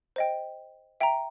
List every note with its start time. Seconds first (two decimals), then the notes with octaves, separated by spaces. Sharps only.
0.16 C5 D#5 G5
1.00 E5 G5 A#5